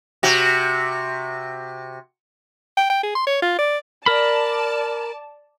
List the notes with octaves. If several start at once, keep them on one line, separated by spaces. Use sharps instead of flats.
C3 F#4
G5
G5
G#4
C6
C#5
F4
D5
A#4 D5 A5 B5